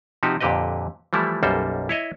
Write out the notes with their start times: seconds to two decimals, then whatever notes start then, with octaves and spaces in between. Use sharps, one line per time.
0.23 C3 F3 D#4 F#4 G4
0.41 F2 A#2 D3 G4 B4 D#5
1.13 E3 F3 G3 A3 E4
1.43 B1 F#2 G3 A#3 A4 C5
1.89 E4 C#5 D#5 E5